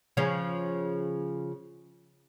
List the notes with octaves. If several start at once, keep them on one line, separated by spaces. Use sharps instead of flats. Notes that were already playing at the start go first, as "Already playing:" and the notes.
C#3 F3 C#4